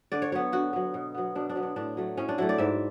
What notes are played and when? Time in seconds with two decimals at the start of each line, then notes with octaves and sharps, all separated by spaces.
0.12 D3 D5
0.22 C#5
0.32 F#3 B3 C#5
0.52 D3 F#4
0.73 F#3 B3
0.94 B2
1.14 F#3 B3
1.35 B2 D4
1.49 D4
1.55 F#3 B3
1.63 D4
1.76 A2 D4
1.97 F#3 A3
2.17 A2 C#4
2.29 D4
2.38 F#3 A3 E4
2.49 D5
2.58 G#2 E5